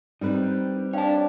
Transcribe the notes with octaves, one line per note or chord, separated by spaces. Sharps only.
G3 C4 D#4 B4
D4 C#5 F5 G5 A5